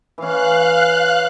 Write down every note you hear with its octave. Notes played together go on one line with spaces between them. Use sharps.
E3 C#4 F5 F#6